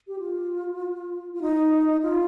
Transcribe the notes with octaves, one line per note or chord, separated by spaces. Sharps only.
G4
F4
F4
D#4
F4